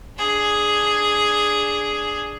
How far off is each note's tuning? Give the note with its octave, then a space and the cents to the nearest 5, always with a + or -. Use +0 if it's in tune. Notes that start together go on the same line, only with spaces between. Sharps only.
D4 +0 G#4 +0